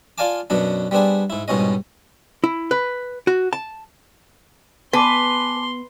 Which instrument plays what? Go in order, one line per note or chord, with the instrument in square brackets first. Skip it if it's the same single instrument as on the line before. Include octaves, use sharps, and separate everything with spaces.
[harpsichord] F4 D5 F5 G#5 A5 D6
F#2 B2 F#3 B3 D4
G3 B3 C4 D4 G#4
G#2 E4
C2 G#2 B2 C#4 D#5
[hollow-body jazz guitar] E4
B4
F#4
A5
[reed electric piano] B3 [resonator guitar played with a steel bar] B4 [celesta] G#5 A5 D6 [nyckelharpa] C6